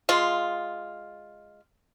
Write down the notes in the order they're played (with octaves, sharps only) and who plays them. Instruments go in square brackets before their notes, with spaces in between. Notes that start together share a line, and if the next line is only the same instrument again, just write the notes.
[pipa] G#3 F4